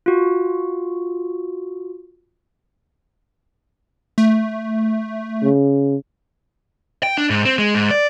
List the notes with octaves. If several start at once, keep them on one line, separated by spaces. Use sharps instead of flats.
F4 F#4
A3
C#3
G5
D4
G#2
C4
G#3
G#2
D5